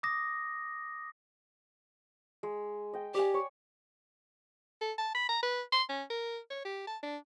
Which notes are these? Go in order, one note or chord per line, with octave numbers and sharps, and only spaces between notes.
D6 D#6 A#6
G#3
D#5 G5
G4 D5 G#5
C#5
A4
A5
B5
A#5
B4
C6
C#4
A#4
C#5
G4
A5
D4